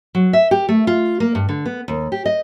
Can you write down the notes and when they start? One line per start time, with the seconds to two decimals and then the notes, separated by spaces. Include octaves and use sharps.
0.15 F#3
0.33 E5
0.51 G4
0.69 A3
0.87 F4
1.20 A#3
1.35 G2
1.49 D3
1.66 B3
1.88 D#2
2.12 G4
2.25 D#5